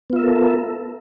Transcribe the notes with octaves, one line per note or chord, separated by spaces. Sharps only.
B3 F4 A4 A#4 E5